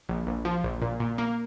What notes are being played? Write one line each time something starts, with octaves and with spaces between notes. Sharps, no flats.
A#1
A#1
F3
A#1
A#2
A#2
A#3